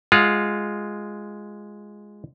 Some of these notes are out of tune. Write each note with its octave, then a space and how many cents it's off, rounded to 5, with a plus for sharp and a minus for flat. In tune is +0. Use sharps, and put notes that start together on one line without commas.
G#3 +0 F4 +0 F#5 -20